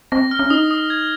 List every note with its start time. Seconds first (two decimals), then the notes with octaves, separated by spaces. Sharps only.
0.12 C4 A#6
0.31 F6
0.39 C#4
0.50 D#4 D#6
0.71 D#6
0.90 G#6